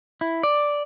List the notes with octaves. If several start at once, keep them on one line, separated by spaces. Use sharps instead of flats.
E4
D5